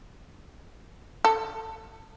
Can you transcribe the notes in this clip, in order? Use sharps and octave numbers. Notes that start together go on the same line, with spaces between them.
A4